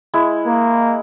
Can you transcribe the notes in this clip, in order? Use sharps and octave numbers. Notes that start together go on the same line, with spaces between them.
G#3 E4
A#3